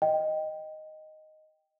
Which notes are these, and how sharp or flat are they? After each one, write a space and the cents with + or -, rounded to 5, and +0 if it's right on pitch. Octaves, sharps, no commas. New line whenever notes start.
D#5 +0 G5 +0